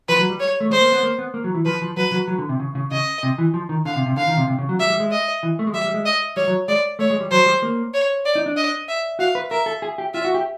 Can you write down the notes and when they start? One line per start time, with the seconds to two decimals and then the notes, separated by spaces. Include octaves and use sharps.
0.08 F3 B4
0.19 F#3
0.30 G3
0.39 C#5
0.61 A3
0.71 G#3 C5
0.81 A#3
0.92 B3
1.03 A#3
1.19 B3
1.34 A#3
1.44 F#3
1.55 E3
1.65 F3 B4
1.82 F3
1.97 F#3 B4
2.12 F#3
2.28 F#3
2.38 D3
2.49 C3
2.60 C#3
2.75 C#3
2.91 C#3 D#5
3.23 C3
3.38 E3
3.54 F3
3.69 D#3
3.85 D3 F5
3.96 C3
4.06 C3
4.17 D3 F5
4.27 D#3
4.37 C3
4.48 C3
4.58 C#3
4.69 F#3
4.79 G3 E5
4.90 G3
5.00 G#3
5.11 D#5
5.43 E3
5.59 A3
5.67 G#3
5.74 G3 E5
5.84 G3
5.94 G#3
6.05 D#5
6.36 G3 C#5
6.47 F#3
6.68 G#3 D5
6.99 A3 C#5
7.10 G#3
7.20 G3
7.31 F#3 C5
7.46 G3
7.63 A#3
7.94 C#5
8.25 D5
8.35 D#4
8.46 D4
8.57 D#5
8.88 E5
9.19 F#4 F5
9.35 B4
9.51 A#4 E5
9.66 A4
9.82 G#4
9.98 G4
10.14 F4 E5
10.25 F#4
10.34 G4